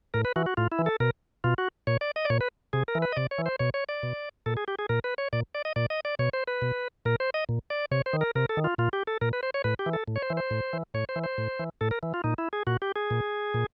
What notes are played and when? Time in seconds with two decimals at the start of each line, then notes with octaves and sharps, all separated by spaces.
0.14 A2 A#4
0.25 B4
0.36 E3 F#4
0.46 F#4
0.57 A2 F4
0.72 E4
0.79 E3
0.86 A4
1.00 B2 A#4
1.44 B2 F4
1.58 F#4
1.87 A#2 C#5
2.01 D5
2.16 D#5
2.25 D5
2.30 A#2 C#5
2.41 B4
2.73 C3 G#4
2.88 A#4
2.95 E3
3.02 B4
3.12 D#5
3.16 C3 D5
3.31 C#5
3.38 E3
3.46 C5
3.59 B2 C#5
3.74 C#5
3.89 D5
4.03 B2
4.46 A#2 A4
4.57 G#4
4.68 G4
4.79 G#4
4.89 A#2 A#4
5.04 B4
5.18 C#5
5.33 A#2 D5
5.55 D5
5.65 D#5
5.76 A#2 D5
5.90 D#5
6.05 D5
6.19 B2 C#5
6.33 C5
6.47 B4
6.62 B2
7.05 A#2 A#4
7.20 C5
7.34 D#5
7.49 A#2
7.70 D5
7.91 C3 C#5
8.06 C5
8.13 D#3
8.21 A#4
8.35 C3 A#4
8.49 A4
8.57 D#3
8.64 F4
8.78 A#2 F4
8.93 G4
9.07 A4
9.21 A#2 A#4
9.33 B4
9.43 C5
9.54 C#5
9.64 A2 B4
9.79 G4
9.86 E3
9.93 A4
10.08 A2
10.16 C#5
10.22 C5
10.30 E3
10.37 C5
10.51 A2
10.73 E3
10.94 A2 C#5
11.09 C5
11.16 E3
11.24 C5
11.38 A2
11.59 E3
11.81 A2 A4
11.91 A#4
12.03 E3
12.14 F4
12.24 A#2 D#4
12.38 E4
12.53 G#4
12.67 A#2 F#4
12.82 G4
12.96 G#4
13.10 A#2
13.54 A#2